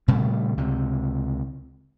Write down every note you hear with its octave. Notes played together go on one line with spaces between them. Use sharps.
A#2 C#3 G3 A3
C#2 C3